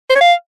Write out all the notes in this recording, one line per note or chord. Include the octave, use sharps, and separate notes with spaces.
C5
C#5
F5